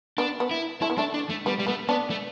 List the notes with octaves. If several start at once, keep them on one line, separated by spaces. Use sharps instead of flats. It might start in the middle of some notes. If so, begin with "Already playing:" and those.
B3 D4
B3
E4
A3 E4
B3
A3 D4
D4
A3
G3 B3
G3
A3 B3
B3 D4
A3